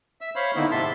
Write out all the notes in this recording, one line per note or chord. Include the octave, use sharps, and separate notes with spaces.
E5 E6
C5 C#5 F5 B5
D3 D#3 A#3 B3 D#4 E4
G#2 C3 E5 A5 C6